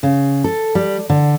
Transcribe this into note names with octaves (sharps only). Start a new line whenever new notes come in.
C#3
A4
G3
D3